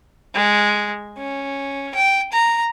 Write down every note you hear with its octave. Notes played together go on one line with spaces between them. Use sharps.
G#3
C#4
G5
A#5